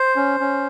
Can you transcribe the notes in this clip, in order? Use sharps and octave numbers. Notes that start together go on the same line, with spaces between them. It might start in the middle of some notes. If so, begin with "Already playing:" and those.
Already playing: C5
C#4
C#4